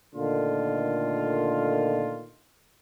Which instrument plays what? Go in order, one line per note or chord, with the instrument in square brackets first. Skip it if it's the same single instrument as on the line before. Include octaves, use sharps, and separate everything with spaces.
[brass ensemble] A#2 D3 D#3 A3 F4